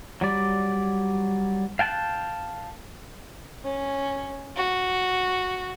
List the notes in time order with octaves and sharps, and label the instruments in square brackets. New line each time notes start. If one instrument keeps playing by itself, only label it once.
[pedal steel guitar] F#3 G3 D5
F5 G5 A5 A#5 F#6
[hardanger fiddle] C#4
F#4